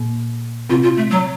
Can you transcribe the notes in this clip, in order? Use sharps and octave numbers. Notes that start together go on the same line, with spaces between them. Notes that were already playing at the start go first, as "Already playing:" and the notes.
Already playing: A#2 A#3
C3 C4 F4
F4
A3
F#3